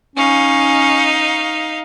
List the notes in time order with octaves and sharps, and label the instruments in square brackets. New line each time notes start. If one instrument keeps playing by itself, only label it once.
[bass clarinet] C#4 [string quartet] D#4 F5